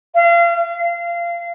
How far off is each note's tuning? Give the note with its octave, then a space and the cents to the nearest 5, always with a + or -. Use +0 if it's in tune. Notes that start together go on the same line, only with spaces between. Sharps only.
F5 -35
F5 -25